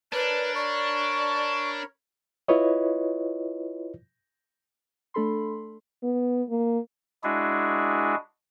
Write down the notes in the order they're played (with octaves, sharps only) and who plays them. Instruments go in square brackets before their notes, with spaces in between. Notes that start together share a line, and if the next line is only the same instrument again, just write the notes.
[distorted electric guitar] D4 [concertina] A#4 C#5 B5 [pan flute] B4 [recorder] D5
[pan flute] D5 [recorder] C#6
[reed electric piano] E4 F4 B4 C#5 D#5
[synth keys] A3 D4 A4 B5 C6
[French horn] B3
A#3
[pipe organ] G#3 D4 E4 F#4 G#4